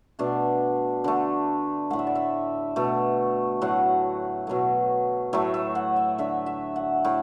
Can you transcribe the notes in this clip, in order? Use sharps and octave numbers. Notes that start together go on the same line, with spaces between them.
B2 A3 D4
D3 A3
A2 A3 F#5
E5
D5
E5
B2 A3
A2 F#3 A3 F#5
B2 F#3 A3
A2 F#3 A3 E5
E5
F#5
E5
D3 A3 E5
E5
F#5
A2